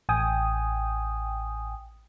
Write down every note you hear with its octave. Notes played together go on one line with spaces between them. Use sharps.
A1 G5 G#5 D#6